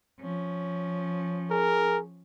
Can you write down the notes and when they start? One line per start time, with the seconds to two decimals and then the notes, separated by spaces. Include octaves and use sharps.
0.21 F3 C#4
1.51 G#4 A#4